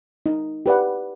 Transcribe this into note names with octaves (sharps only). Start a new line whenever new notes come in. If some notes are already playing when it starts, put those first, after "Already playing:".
D#4
G4 B4 D5 F#5